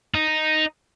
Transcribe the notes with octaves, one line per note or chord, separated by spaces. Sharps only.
D#4